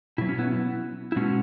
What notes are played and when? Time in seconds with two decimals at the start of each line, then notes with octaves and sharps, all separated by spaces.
0.18 B2 F#3 E4
0.29 C#4
0.39 B3 E4
1.12 E4
1.16 B2 G#3 C#4 F#4